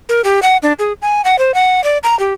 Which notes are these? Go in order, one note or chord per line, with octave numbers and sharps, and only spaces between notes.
A#4
G4
F#5
D4
G#4
G#5
F#5
C5
F#5
D5
A#5
G4